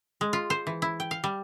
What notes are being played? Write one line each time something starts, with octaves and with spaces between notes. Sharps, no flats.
G#3
F4
C5
E3
E4
G5
F5
G3